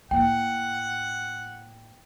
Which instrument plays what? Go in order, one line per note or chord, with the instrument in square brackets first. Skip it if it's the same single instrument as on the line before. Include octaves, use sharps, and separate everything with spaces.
[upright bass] A2 A#3 [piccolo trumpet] F#5 [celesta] G5